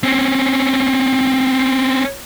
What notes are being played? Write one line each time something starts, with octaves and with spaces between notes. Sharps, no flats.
C4 C#4